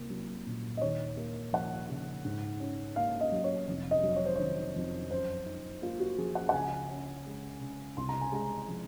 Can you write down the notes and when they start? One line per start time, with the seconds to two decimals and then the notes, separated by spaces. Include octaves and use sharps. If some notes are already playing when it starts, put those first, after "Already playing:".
Already playing: C2 A#3
0.10 F#3
0.47 A#2
0.77 D#5
0.81 D#2 C#5
1.17 A#3
1.53 F3 F#5
1.89 C#3
2.25 G#2
2.60 C#4
2.96 A#3 F5
3.21 D#5
3.32 F#3
3.44 C#5
3.68 F1
3.91 D#5
4.03 F#3
4.16 C#5
4.25 C5
4.35 D#3 C#5
4.76 F2
5.10 F#2 C5
5.46 D#4
5.82 A#3 F4
6.00 F#4
6.18 F3 G#4
6.35 F#5
6.49 F#5
6.53 C#2 G#5
6.90 C#4
7.26 G#3
7.61 C#3
7.97 C2 C6
8.09 A#5
8.21 G#5
8.32 G#3 A#5
8.69 F3